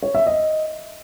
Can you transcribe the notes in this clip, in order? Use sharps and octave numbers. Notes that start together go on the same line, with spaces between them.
C#5
E5
D#5